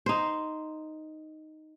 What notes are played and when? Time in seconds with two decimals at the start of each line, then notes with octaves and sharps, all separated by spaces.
0.06 D#4 C5